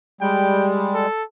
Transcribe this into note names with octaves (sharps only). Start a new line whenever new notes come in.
G3 G#3 G5
A4